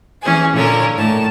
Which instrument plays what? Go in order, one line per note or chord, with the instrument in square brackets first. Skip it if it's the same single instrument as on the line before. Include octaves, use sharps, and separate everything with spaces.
[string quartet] E3 C#4 G#4 G#5
A#2 D3 A#4 C#5
A2 A5